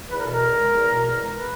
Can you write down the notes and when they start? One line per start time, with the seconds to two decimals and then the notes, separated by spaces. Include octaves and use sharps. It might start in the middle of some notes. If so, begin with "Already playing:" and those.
0.09 E2 B4
0.17 A#4
0.24 B2 A4
0.31 A#4
0.40 E2
0.56 G#3
0.71 E2
0.87 B2
1.03 E2
1.19 G#3
1.34 B4